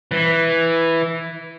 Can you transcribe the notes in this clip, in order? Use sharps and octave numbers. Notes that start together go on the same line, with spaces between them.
E3